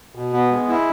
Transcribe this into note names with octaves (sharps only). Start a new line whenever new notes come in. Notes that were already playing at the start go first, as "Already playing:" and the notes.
B2
B3
G#3
E4